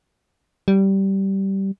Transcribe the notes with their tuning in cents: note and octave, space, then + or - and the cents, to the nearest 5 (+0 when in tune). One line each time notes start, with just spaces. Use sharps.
G3 -15